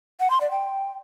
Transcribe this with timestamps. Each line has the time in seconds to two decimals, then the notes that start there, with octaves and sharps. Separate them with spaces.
0.20 F#5
0.30 C6
0.41 D5
0.51 G5